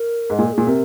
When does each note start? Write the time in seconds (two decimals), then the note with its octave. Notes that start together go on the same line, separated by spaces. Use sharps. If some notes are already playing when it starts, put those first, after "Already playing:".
Already playing: A#4
0.30 G#2
0.39 A#2 G#4
0.46 A#4
0.53 A#2 G#4
0.67 C3 A#4